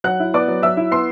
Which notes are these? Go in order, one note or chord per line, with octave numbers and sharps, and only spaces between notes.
F#3 F#5 F#6
E4
B3 D5 D6
F#3
F#3 E5 E6
E4
B3 C6 C7